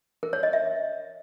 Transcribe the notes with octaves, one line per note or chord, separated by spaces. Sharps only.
A#4
C#5
D#5
E5